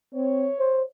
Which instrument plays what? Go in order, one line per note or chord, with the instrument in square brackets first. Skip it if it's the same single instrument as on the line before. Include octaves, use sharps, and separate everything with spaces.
[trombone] C4 [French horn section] C#5
[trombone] C5